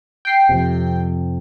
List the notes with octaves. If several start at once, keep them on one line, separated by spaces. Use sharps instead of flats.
G5 C7
F2 C3